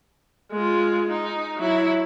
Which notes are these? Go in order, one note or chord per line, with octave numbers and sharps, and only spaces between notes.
G#3 F4
D#4
F#3 E4